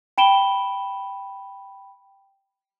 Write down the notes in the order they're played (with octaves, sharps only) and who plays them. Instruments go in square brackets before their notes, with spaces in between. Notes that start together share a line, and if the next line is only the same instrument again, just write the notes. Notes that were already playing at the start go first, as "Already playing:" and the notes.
[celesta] G5 B5 D7 E7 G7